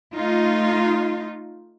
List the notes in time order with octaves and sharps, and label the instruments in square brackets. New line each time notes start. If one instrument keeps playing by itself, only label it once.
[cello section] A3 D#4 F4